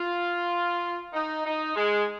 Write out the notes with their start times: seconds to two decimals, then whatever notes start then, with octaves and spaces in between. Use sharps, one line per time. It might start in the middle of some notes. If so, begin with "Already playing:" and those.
Already playing: F4
1.13 D#4
1.45 D#4
1.76 G#3